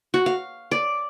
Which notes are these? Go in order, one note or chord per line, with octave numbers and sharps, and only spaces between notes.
F#4
F5
D5